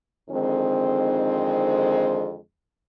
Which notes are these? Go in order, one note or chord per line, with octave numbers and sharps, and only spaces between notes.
F2 D3 D#3 G#3 C4 D#4